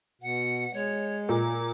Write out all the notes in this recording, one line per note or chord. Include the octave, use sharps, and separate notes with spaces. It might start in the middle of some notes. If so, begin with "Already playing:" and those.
B2 F#5
G#3 C#5
A#2 D6